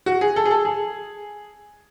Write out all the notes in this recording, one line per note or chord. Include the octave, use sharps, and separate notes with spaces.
F#4
G#4
A4
G#4
A4
G#4